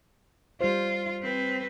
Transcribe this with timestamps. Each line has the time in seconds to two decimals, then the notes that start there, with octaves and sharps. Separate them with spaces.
0.61 G3 F4 C5
1.22 C4 B4